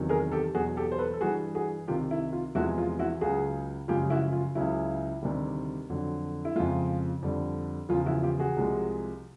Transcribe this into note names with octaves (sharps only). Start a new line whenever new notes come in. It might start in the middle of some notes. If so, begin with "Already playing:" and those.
Already playing: E2 C3 D#3 F#3
G#4 A#4
G4 A4
E2 B2 F#3 F#4 G#4
G4 A4
C5
A4 B4
A4
G2 E3 G3 F#4 G#4
F#4 G#4
C2 C3 D#3 F4 G4
E4
F4
E2 C3 F3 G#3 E4 F#4
F4
E4 F#4
C#2 C#3 F#3 F#4 G#4
F#2 C#3 F3 G#3 F4 G4
E4 F#4
F4
C#2 C#3 F#3 E4
D2 C3 D#3 G3
F2 D3 F#3
E4
F2 C#3 F3 G#3 F4
F2 D3 G3
E2 C#3 F3 F4
E4 F#4
F4 G4
F#4 G#4
C2 C3 F3 G#3